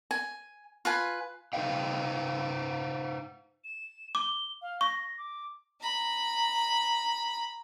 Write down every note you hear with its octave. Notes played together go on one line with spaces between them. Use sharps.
G#5
F4 B4 G#5
D#4 B4 C5 F5 G5
E7
D6 G7
F5
C#6 A#6
D6
A#5 B5